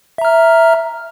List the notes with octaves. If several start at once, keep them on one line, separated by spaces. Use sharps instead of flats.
E5 A#5 F6